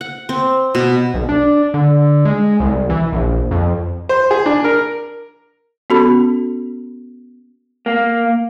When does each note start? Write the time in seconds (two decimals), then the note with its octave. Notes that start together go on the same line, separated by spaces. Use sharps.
0.01 F#5
0.29 C4
0.75 B2
1.14 B1
1.29 D4
1.74 D3
2.25 G#3
2.60 C2
2.90 E3
3.12 A#1
3.51 F2
4.09 C5
4.31 G#4
4.46 D4
4.64 A#4
5.90 B3 C#4 F#4 A4 B5
7.86 A#3